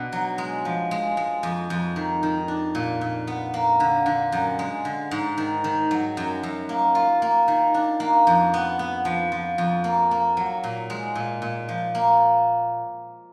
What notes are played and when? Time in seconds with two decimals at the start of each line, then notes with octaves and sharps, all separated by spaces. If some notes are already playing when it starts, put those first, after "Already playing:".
Already playing: B2 D4
0.12 F#3
0.38 G#3
0.65 F3
0.91 G#3
1.17 G#3
1.43 F2
1.70 F2
1.96 D#3
2.23 D#3
2.48 D4
2.75 A#2
3.01 A#2
3.27 B3
3.54 A#3
3.80 D3
4.06 D3
4.32 F#2
4.59 G#3
4.85 D3
5.11 G#2
5.38 D#3
5.64 D#3
5.91 F#3
6.17 F#2
6.43 F#2
6.69 A#3
6.95 F4
7.22 A#3
7.48 D#3
7.74 D4
8.00 A#3
8.27 F2
8.54 B3
8.79 B3
9.05 F3
9.32 F3
9.58 F2
9.84 A#3
10.11 A#3
10.37 F#3
10.64 A#2
10.90 G#3
11.15 A#2
11.42 A#2
11.69 F3
11.95 A#3